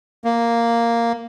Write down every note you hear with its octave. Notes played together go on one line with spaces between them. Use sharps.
A#3